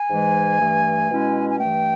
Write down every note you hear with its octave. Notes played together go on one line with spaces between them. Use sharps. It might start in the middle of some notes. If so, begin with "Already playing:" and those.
Already playing: G#5
G#2 E3 G#3
G2 E3 A3
B2 G#3 C#4 E4
G#5
G2 E3 A3 G5